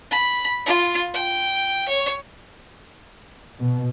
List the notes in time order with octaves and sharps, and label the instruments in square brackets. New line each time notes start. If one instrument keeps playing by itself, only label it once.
[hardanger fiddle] B5
F4
G5
C#5
[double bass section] B2